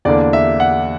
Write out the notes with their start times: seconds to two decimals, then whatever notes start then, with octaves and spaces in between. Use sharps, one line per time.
0.05 E2 D3 A#3 D4 D5
0.33 E5
0.60 F#5